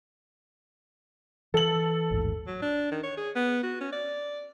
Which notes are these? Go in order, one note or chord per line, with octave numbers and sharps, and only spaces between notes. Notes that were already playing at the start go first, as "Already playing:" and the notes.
E3 A4 F#7
A1 D#2 G#2
F#3
D4
D#3
C#5
G#4
B3
F#4
C#4
D5